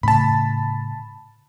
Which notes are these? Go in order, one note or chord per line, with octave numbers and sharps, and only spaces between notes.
A2 C#3 A5 B5